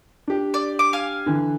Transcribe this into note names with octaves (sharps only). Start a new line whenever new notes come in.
D4 G4
D5
D6
F5 G#5 F6
D3 E3